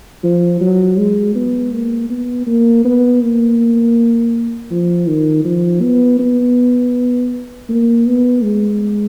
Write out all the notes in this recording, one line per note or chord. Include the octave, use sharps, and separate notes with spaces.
F3
F#3
G#3
B3
A#3
B3
A#3
B3
A#3
F3
D#3
F3
B3
B3
A#3
B3
G#3